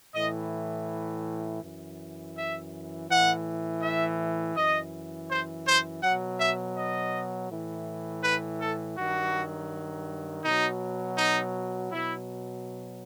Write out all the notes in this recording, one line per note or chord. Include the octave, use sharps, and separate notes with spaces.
A2 E3 D#5
F#2 E3
E5
A2 E3 F#5
E5
F#2 E3 D#5
C5
C5
B2 F#3 F#5
E5
D#5
A2 E3
B4
A4
G2 D#3 F#3 F#4
B2 F#3 D#4
D#4
B2 F#3 E4